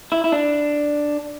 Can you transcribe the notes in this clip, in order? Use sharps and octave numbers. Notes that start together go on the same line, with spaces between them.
E4
E4
D4